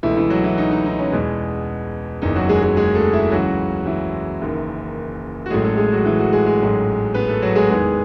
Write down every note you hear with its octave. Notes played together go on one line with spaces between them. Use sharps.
C#2 B2 E3 A3 E4
E3 E4
F#3 F#4
E3 E4
D#4
D#4
D#4
C#4
E2 B2 G#3 B3
F#1 E2 D#3 D#4
F#3 F#4
G#3 G#4
G#3 G#4
G#3 G#4
A3 A4
E4 E5
C#2 C#3 E3 F#3 F#4
E3 E4
F#1 F#2 D#3
F#4
A1 A2 F#3 G#3 A3 G#4
A3 A4
G#3 G#4
F#3 F#4
E3 E4
F#3 F#4
G#3 G#4
G#3 G#4
A1 G#2 F#3 A3
B3 B4
A3 A4
F#3 F#4
G#3 G#4
E2 D#3 G#3 B3